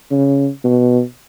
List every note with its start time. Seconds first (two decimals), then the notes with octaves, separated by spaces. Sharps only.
0.11 C#3
0.64 B2